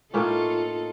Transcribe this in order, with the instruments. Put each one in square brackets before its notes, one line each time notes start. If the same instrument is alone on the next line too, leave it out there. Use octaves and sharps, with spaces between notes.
[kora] A2 A#3 C#4 [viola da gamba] D#4 F4 A4